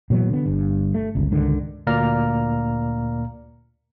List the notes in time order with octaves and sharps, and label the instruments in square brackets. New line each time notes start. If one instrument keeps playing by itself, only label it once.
[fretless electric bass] A#2 E3 F#3 B3
D3 B3
G1 G2
A3
G1 C#2
C#2 G#2 D3 D#3
[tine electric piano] D2 A#2 A#3 D5 A#5 F6